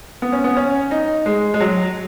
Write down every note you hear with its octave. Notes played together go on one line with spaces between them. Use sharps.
B3
C#4
B3
C#4
D#4
G#3
G#3
F#3